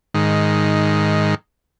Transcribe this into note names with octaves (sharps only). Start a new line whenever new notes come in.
G#2 D#3